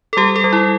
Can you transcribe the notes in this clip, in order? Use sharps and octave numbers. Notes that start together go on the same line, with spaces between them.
A4
G3 G4
A4
G3
E4